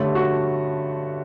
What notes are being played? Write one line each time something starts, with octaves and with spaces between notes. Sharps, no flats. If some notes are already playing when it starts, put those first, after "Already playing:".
Already playing: G2 D3 A3 C#4
F#4